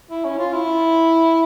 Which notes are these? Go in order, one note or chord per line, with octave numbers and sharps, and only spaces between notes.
E4
C#4
F4
E4